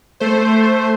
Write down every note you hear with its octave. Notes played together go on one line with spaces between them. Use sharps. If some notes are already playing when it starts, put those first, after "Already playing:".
A3 C5